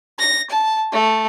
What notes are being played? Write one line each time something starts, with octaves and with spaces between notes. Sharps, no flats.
A#6
A5
A3